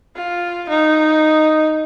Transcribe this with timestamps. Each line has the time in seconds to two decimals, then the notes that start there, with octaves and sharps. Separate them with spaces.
0.16 F4
0.69 D#4